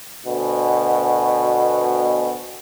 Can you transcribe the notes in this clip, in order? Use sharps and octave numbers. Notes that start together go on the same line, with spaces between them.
D2 B2